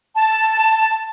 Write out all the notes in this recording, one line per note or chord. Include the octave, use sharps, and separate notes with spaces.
A5